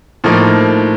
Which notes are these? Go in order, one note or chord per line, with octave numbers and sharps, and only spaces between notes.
A2 F3 A#3 D#4